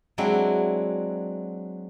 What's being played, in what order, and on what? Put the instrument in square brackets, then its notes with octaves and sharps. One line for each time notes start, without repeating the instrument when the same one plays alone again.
[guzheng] F#3 G#3 C4 D4 E4